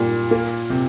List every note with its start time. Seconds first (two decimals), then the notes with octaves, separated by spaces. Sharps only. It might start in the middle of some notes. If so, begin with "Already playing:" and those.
Already playing: A#2 G3
0.31 A#3
0.70 C3